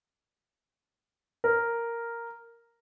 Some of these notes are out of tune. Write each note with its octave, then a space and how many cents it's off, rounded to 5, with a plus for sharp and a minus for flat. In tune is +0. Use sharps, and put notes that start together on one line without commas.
A#4 -5